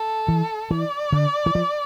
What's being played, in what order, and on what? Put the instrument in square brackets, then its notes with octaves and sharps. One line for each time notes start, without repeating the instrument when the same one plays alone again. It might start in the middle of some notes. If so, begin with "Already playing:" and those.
Already playing: [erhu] A4
[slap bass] E3
[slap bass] E3 [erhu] D5
[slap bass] D3
E3
F3